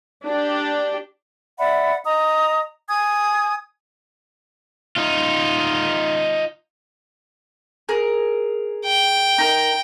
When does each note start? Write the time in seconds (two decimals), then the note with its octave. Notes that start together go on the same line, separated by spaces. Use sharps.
0.25 D4 G4
1.59 D5 E5 F#5 B5
2.04 D#5 A#5 D#6
2.88 G#5 D#6 G#6
4.96 D#4 F4
7.89 G#4 A#4
8.86 G5
9.38 D#4 A#4